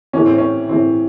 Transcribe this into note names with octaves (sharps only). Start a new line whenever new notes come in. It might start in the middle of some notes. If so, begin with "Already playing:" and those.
A2 E3 C#4
C4
C#4
A2 E3 C4